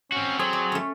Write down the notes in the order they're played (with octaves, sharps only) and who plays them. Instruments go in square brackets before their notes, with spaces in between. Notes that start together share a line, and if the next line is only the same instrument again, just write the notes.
[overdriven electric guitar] C4 F#4 [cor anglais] C#4
[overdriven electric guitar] F#3 [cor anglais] C4 [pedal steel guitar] G#4 C#5 [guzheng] A4
[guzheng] D5
A3 C#4